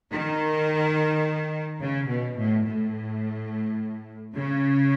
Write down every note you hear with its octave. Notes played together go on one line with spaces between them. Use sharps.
D#3
C#3
B2
A2
A2
C#3